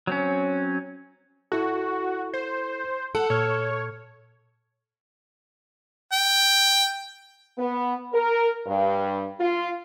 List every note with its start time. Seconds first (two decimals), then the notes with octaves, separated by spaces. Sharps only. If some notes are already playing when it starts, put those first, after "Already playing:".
0.07 F#3 C4 C#4
1.52 E4 F#4 A4
2.34 C5
3.15 A4 F#5
3.30 A#2 C#5 F6
6.13 G5
7.58 B3
8.13 A#4
8.67 G2
9.40 F4